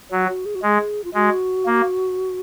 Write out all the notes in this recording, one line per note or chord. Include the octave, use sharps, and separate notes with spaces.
F#3 F#4
F#4
G#4
F#4
G#3 G#4
F4
G#3 F#4
A#3